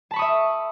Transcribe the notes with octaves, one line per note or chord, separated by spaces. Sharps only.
E5 A5 B5 C#6 D#6